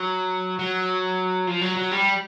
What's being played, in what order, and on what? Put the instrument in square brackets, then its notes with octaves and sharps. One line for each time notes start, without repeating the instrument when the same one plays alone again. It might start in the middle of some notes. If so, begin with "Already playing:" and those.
Already playing: [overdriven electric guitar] F#3
F#3
F3
F#3
F#3
G3